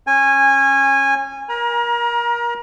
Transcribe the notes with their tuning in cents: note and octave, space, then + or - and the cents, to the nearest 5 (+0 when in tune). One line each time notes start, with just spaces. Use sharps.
C#4 -25 G#5 -15
A#4 +25 A#5 +35